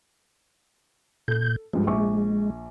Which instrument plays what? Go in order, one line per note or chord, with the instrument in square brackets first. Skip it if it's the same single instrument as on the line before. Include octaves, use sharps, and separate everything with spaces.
[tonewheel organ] A#2 G6 [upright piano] A4
[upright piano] G2 F3 [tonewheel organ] G#3
[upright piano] A#1 C#6 D6